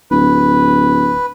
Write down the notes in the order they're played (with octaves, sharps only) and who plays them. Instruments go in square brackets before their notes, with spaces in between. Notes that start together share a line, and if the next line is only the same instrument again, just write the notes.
[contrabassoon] D1 [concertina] B4